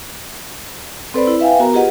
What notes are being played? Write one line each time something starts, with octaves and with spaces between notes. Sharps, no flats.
C4 A4 B4 C5 D5 B5
E4
B4 E5 F5 G5 G#5
B3 F#4 A#4 A#5
F4 G4 G#4 B4 D#5 F#5